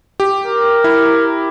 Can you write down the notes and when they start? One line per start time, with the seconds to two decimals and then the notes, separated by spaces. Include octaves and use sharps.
0.20 G4
0.45 A#4
0.84 E4